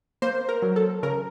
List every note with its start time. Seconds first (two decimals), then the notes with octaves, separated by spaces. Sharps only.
0.22 A#3 C5
0.49 A#4
0.62 F#3
0.76 A4
1.03 C#3 A#4